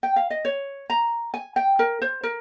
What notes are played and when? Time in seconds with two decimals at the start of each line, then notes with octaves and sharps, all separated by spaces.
0.03 G5
0.16 F5
0.30 D#5
0.45 C#5
0.90 A#5
1.34 G#5
1.56 G5
1.79 A#4
2.02 C5
2.23 A#4